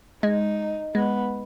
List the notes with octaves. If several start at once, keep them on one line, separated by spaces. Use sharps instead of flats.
G#3 D#4
G#3 B3